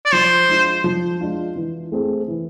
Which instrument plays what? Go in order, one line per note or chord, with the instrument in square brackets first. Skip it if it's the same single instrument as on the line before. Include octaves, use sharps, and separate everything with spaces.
[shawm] D5
[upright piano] F3 [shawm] C5
[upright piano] G#3 D4 F4
F3
G#3 D4 F4
E3
A3 C4 G#4
E3